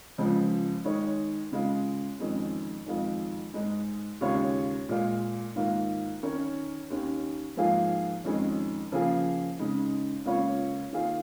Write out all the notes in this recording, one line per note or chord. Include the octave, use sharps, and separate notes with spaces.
C#2 C#3 F3 G#3
D#3 G#3 D#4 C#5
C#3 G#3 F4
F2 D#3 G#3 C#4
F2 D#3 G#3 F4
G#2 G#3 D#4
D#2 C#3 G#3 F4 C#5
A#2 G#3 F4
G#2 D#3 A#3 F4
D#3 C#4 A#4 C#5
D#2 D#3 C#4
G#2 F3 A#3 F4 G#4
F2 D#3 G#3 C#4 G#4
C#3 F3 A#3 F4 G#4
C#3 G#3 D#4
C#2 C#3 A#3 F4 C#5
D#3 A#3 F4 G#4